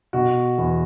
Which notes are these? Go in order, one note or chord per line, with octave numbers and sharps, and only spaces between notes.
B2 F#4
E2